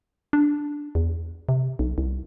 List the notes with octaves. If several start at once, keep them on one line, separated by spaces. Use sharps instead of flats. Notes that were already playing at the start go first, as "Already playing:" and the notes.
D4
E2
C3
B1
C2